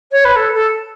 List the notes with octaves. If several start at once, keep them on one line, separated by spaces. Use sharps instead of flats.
C#5
B4
A4
A4